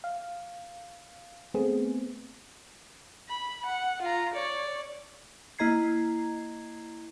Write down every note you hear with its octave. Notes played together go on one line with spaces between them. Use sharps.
F5
A3 B3 C4 G#4
B5
F#5
F4 A#5
C#5 D5
A#3 E4 D#5 A#5 G#6 C7